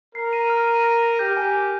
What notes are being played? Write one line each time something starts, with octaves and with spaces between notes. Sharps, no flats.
A#4 C7
D#7
F6
D#7
A#6
A#6
G4 G6
G#5
G6